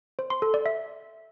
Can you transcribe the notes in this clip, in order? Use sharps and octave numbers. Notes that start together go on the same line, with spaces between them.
C5
C6
A4
D5
E5